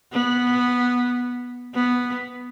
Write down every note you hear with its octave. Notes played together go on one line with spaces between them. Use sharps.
B3
B3